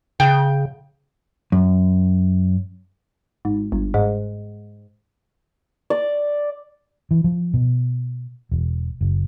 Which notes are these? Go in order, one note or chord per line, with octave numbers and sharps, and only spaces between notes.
C#3 G5
F#2
G#1
G1
G#2
D5
E3
F3
B2
E1
F#1